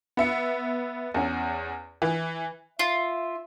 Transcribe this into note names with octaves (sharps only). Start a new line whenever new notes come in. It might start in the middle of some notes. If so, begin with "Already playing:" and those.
B3 E5 C#7
E2 C#4
E3
F4 E5